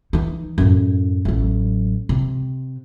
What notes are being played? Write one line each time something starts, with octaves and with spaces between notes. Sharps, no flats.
E3 D#4
F#2 A2
A1 F#3
C3